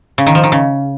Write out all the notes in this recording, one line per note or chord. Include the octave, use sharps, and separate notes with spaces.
C#3
D#3
F3
D#3
C#3